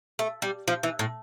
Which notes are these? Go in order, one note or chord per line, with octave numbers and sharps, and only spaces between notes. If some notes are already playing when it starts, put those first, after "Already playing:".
A3
G3
F3
E3
A2